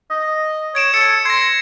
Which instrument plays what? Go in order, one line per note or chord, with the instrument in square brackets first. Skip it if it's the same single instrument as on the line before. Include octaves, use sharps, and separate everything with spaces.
[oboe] D#5
[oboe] C#5 [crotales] G#6 D7 E7
[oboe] A4 [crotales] C#7
[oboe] C6 [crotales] G#6 A#6